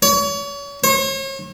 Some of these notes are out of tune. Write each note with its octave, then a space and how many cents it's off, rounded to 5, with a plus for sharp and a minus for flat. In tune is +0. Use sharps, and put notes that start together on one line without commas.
C#5 +35
C#5 -40